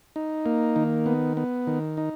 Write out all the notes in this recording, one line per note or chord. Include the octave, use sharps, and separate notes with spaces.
D#4
A#3
D#3
B3
B3
D#3
D#4